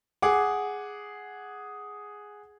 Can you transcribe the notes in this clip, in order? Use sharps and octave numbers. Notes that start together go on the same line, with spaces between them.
G#4 F#5 D6